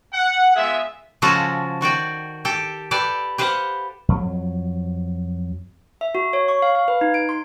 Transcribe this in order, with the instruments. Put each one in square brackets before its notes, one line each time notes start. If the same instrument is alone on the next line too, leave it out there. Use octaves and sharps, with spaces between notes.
[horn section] F#5
G#3 B3 F4 G#4 E5
[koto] C#3 F3 G#3 F4 F#4 A4
D#3 F#4 D5 G5
G4 A4 G5
G4 A4 B4 D5 A5
G4 B4 C5 F5 F#5
[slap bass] F2 F#3
[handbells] E5
F#4
C#5
C#6
F5
F5
B4
D#4
D7
C6